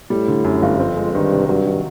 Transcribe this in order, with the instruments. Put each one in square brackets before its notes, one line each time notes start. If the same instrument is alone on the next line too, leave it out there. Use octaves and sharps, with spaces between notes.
[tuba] A2 [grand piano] G3
[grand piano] D3
F#2
G1
[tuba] F2 [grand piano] C4
[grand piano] G#3
[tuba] G2 [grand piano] D#3
[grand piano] C3
[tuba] G2 [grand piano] F#3
[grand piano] D#3